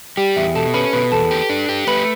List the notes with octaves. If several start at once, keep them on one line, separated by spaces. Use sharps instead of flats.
G3 G4 G5
E2 E5
B2 A4 A5
C#4 B4 B5
B2 B4 B5
E2 A4 A5
G4
D4
G4
A3 B4 B5